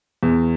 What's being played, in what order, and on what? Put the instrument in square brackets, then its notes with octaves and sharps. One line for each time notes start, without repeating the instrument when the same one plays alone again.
[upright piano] E2